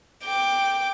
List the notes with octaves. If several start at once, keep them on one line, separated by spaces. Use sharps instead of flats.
G5 D6